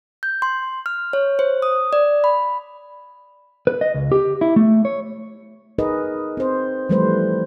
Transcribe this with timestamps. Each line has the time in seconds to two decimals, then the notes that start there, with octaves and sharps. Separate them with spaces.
0.23 G6
0.42 C6
0.86 F6
1.13 C#5
1.39 C5
1.62 D#6
1.93 D5
2.24 B5
3.67 B4
3.81 D#5
3.94 C#2
4.12 G4
4.41 E4
4.56 A3
4.85 C#5
5.78 D#4 G#4 A#4 B4 D#5
6.37 C4 C5
6.89 E3 F3 G3 A3 B4 C5